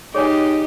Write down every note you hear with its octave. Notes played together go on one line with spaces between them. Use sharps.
D#4 G4 G#4 C#5 G#5